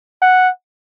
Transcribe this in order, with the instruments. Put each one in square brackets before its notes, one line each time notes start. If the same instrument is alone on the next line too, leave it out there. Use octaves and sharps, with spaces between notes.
[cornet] F#5